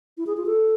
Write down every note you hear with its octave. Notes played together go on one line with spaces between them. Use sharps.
E4
G#4
F4
A4